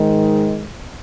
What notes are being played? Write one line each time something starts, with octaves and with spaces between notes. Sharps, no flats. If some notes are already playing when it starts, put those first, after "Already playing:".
Already playing: G#2 D#3 G#3